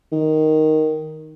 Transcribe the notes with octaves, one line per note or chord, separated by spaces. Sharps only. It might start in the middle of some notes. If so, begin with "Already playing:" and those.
D#3